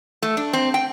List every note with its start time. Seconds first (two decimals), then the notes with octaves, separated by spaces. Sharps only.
0.22 A3
0.37 D4
0.53 C4
0.74 G5